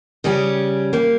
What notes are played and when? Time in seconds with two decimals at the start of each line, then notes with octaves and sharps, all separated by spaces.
0.24 C#3 G3 C#4 G4
0.93 G3 A#3